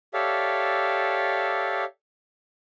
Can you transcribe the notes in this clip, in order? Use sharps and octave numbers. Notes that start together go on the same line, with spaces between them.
G4 A4 C#5 D5 E5 F5